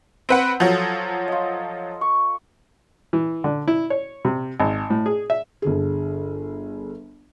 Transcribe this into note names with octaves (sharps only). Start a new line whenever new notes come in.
C4 B4 F#5
F3 F#3 A4 D#6
F4 D#5
C#6
E3
D3
E4
C#5
C3
G#1
A2
G#4
E5
G1 D3 G#4